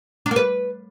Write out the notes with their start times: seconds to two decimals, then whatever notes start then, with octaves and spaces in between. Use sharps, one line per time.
0.26 D4
0.31 A#3
0.36 B4